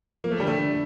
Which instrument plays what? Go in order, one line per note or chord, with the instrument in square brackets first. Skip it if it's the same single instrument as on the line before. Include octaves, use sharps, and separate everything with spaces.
[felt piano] F3 [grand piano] A#3
[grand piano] A3
[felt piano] D3 [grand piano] G3
[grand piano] A3
[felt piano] D3